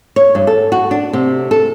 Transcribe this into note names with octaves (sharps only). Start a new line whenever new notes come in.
C#5
G2
A4
F#4
D4
C3
A4